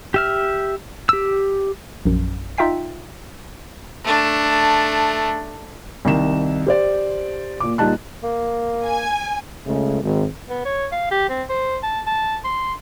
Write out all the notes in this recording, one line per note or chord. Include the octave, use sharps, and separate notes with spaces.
G4 E5 F6
G4 E6
A#1 F#2
D#4 F4 E5 G5 B6
A3 D4
C2 D#3 E7
G4 C5 D5
A#2 D6
A#2 G3 D#4 A5 F#6
A#3
G#5
C#2 C#3 G#3 A3
G#1
B3
C#5
F5
G4
C4
C5
A5
A5
C6